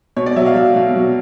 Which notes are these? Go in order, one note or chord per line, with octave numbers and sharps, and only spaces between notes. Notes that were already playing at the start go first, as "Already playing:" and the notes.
B2 C#5
D5
F#3 E5
F5
F#3
B2
F#3